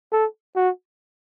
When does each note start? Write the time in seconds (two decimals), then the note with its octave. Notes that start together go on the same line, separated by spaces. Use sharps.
0.12 A4
0.56 F#4